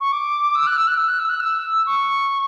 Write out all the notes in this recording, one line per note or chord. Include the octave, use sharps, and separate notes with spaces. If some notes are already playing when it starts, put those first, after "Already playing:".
C#6
D6
E6
F#6
E6
F#6
E6
F#6
E6
F#6
E6
C#6